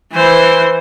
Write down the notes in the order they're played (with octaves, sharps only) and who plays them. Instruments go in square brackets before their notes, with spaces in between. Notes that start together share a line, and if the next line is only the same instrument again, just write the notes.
[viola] E3 C5